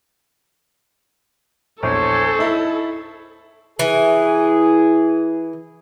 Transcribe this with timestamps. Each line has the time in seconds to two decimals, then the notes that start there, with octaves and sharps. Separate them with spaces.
1.83 A#1 E2 A4 C5 C#5
2.39 D#4 E4
3.79 E3 G#4